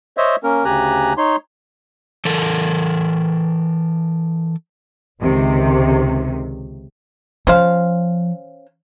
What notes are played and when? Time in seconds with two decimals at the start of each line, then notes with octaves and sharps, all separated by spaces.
0.17 C5 C#5 D#5 E5
0.44 A#3 C#4 A#4
0.65 D2 C#3 G4 G#5 A#5 F#6
1.17 D#4 C#5 C6
2.25 E3 A4 A#4
5.21 C#2 C3 D#3
7.47 F3 C#4 C5 F5